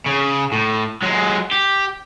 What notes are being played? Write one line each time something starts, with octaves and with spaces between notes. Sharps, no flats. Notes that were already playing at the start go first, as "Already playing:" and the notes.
C#3
A2
F#3 G#3
G4